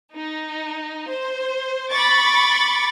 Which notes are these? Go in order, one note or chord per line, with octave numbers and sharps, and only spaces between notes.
D#4
C5
B5 C#6 D6 A6